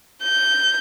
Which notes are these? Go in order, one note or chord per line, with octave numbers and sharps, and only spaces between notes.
G6